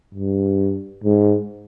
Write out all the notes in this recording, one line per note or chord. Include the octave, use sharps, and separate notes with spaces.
G2
G#2